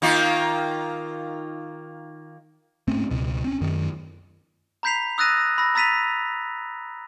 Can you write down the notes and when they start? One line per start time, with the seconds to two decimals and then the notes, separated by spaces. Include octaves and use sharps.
0.02 D#3 A#3 F4
2.88 G#2 A3 C4 C#4
3.11 C#2 B2
3.44 C4 C#4
3.61 F#2 D#3
4.83 A#5 B5 G6 B6 C7 F7
5.18 D#6 E6 F#6 A6 A#6 D#7
5.58 B5 E6 A#6
5.75 A#5 E6 A6 B6 D#7 F7